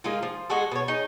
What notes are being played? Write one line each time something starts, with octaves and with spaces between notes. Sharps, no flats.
G#3 A#3 D#4 F4
F3
G#3 F#4 G#4 A4
B2 C#5
D#4 G#4 C#5